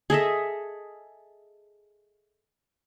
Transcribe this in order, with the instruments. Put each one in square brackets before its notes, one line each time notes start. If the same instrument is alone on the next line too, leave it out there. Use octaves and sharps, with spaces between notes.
[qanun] G#4 A4 D#5 E5